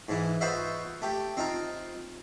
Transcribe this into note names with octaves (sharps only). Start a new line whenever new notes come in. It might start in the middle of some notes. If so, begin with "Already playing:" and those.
G#2 E3
F4 F#4 B4 C5 D#5 E5
A3 G4
C4 D#4 F4